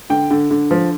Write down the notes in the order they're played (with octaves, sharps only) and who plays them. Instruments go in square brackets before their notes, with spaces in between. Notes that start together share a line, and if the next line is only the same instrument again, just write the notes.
[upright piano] D3 G5
D3
D3
F3